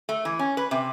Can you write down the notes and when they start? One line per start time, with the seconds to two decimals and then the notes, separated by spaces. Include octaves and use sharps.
0.09 A3
0.25 E3
0.39 C#4
0.57 B4
0.71 C3